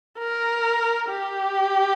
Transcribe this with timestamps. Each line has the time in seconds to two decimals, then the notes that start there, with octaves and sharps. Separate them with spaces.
0.18 A#4
1.09 G4